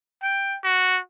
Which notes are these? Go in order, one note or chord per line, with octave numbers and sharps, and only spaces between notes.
G5
F#4